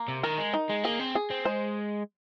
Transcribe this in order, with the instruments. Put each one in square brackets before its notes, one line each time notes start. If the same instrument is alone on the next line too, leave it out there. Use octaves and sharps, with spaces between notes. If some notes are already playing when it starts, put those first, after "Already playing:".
Already playing: [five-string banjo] A#3
[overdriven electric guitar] C3
[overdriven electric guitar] D#3 [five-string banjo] A#4
[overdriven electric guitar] G#3
[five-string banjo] D#4
[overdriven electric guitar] G#3
[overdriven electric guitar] A#3 [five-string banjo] G#4
[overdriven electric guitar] C4
[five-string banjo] G#4
[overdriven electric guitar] C4
[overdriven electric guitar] G#3 [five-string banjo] C5